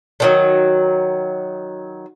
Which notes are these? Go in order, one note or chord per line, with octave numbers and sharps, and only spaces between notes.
D3 D#3 F#3